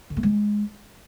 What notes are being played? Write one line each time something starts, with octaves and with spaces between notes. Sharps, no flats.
D3
A3
G#3